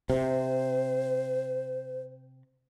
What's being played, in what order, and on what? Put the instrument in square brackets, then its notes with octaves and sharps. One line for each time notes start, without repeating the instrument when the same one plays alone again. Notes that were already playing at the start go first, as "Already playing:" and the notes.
[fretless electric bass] C3 [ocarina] C5